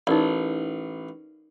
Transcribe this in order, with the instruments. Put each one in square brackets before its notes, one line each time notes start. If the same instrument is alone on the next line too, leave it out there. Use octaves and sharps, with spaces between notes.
[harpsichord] A1 [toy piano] D#4 A#4 D5